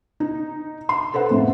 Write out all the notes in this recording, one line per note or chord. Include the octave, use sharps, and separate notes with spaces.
D#4
C6
A4 B4 C5 F#5
F2 A2 C#3